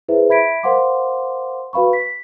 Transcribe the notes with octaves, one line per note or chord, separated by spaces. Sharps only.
E4 G#4 B4 C5 E5
E5 B5 G#6 B6 D7
A#4 C5 F5 F#5 C6 D6
F#4 B4 F5 B5 C#6
B6